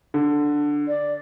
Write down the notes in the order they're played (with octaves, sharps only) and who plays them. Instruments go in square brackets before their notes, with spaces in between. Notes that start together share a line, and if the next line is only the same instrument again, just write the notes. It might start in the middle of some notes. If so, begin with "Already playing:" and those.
[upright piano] D3
[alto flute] D5